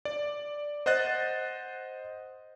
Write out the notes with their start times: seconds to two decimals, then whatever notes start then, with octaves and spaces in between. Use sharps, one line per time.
0.05 D5
0.86 C5 D#5 F#5 F#6 A6